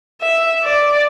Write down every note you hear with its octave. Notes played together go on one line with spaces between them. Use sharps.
E5
D5